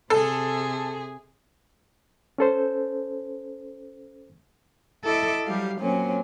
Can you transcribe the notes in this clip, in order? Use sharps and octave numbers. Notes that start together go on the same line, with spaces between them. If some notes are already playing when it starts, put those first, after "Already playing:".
C3 G#4 A4
C#4 A4 C5
E4 A4 D#5 E5 D6
F#3 G3 G4 F5
A#2 F#3 C4 C#4